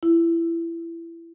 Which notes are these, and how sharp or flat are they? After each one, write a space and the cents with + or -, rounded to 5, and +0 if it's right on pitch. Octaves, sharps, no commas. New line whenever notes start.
E4 +20